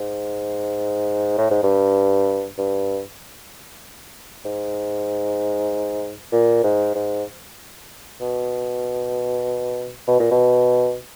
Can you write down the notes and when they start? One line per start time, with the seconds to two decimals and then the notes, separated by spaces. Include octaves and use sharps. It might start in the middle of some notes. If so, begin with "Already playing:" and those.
Already playing: G#2
1.37 A2
1.51 G#2
1.63 G2
2.58 G2
4.45 G#2
6.32 A#2
6.63 G#2
6.95 G#2
8.21 B2
10.08 B2
10.19 A#2
10.31 B2